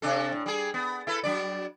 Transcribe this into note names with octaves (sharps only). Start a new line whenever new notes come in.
C3 D4 A4
A2
G3 G#4
B3
E4 A4 B4
F#3 D4 D5